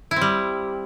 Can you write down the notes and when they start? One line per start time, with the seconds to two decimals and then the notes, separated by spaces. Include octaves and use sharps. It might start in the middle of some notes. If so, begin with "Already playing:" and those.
0.11 E4
0.16 C4
0.21 G3